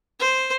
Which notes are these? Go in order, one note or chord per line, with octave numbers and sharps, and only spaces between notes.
C5